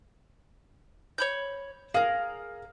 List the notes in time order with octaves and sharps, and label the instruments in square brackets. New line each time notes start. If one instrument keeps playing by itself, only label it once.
[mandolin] C#5 B5 G6
[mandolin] G#4 A#4 [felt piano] F5